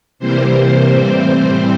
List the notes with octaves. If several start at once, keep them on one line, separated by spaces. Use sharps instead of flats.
C3 E3 G3 A#3 C5
A2 E3 G3 C4